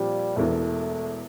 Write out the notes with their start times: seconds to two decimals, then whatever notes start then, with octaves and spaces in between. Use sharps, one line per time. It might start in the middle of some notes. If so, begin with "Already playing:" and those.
Already playing: A#2 F3 G3 C4 G4
0.36 E1 E2 E3 A3